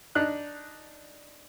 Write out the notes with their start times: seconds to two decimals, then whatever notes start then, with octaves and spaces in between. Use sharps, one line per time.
0.15 D4 D#4 F#6